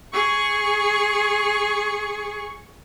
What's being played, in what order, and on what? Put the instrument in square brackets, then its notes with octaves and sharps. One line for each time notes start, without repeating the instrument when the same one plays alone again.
[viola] G#4 C#6